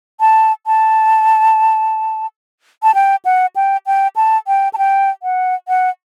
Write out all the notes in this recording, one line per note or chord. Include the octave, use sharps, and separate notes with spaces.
A5
A5
A5
G5
F#5
G5
G5
A5
G5
A5
G5
F#5
F#5